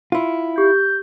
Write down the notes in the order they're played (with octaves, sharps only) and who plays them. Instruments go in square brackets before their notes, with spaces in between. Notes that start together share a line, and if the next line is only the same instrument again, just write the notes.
[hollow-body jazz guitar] E4 F4
[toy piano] G4 [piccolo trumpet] G6